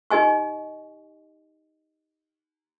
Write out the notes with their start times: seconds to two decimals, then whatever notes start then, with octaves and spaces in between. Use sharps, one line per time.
0.10 D#4 G4 D#5 G#5 C#6